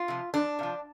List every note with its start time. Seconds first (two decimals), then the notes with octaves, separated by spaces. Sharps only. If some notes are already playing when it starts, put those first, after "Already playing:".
Already playing: F4
0.08 C3 F3
0.34 F2 D4
0.59 C3 F3